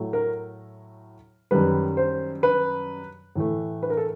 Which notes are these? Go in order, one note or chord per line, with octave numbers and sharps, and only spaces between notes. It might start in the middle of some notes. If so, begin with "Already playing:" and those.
Already playing: A2 F#3 A3
A#4
F#2 D#3 G3 B4
C5
B4
A2 E3 A3
B4
A#4
A4